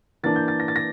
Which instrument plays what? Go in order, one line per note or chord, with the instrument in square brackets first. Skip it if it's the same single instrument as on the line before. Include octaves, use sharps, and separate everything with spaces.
[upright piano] E3 A#3 D4 A6
G6
A6
A#6
A6
A#6